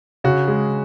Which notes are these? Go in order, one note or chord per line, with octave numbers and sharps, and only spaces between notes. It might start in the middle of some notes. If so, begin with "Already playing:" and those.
C#3 F#4
G#3